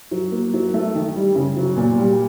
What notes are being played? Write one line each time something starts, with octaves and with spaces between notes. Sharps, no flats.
F#3
A#3
F#3
A3
D#3
G3
C#3
F#3
A#2
G3